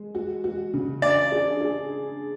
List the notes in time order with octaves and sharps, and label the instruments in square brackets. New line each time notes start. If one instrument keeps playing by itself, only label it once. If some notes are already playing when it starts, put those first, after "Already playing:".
Already playing: [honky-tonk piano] G#3
F#4
F#4
C#3
[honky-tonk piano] D4 [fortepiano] D5
[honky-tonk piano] G#4
G#4